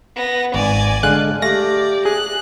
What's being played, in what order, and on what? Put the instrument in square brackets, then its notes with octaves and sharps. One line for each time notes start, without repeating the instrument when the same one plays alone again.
[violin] B3 A#6
[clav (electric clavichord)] G#1 [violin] D5 G#5
[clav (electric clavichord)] D3 G#3 F5 [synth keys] F#6
[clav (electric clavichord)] A3 F5 [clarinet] G4 [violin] D5 [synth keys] A#6
[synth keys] G#4 [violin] F#6